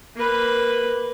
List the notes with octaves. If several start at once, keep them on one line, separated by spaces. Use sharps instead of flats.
A#3 B4